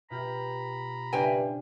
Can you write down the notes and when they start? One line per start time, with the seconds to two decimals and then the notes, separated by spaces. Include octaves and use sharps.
0.10 B2 F4 G4 A#5 B5
1.13 G2 C#3 D4 E4 C5 G5 G#5